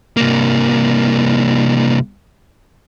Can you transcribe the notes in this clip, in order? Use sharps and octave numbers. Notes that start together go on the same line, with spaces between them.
C2 A#3